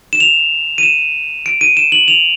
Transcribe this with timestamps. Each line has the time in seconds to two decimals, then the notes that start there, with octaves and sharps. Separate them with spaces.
0.13 E7
0.20 F7
0.78 D#7
0.83 E7
1.46 D7
1.61 D#7
1.77 E7
1.92 F#7
2.08 F7